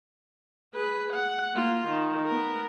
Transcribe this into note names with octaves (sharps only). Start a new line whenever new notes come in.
G#4 B4
F#5
A#3 F4
D#3
B3 A#4